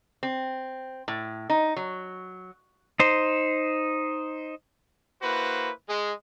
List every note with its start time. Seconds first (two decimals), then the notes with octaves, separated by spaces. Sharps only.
0.23 C4
1.08 A2
1.50 D#4
1.76 F#3
3.00 D#4 C5
5.22 A#3 E4 F#4 B4 C5
5.88 G#3